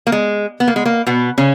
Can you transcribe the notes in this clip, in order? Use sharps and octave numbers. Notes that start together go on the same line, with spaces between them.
A#3
G#3
B3
A#3
G#3
A#3
B2 B3
C#3 C#4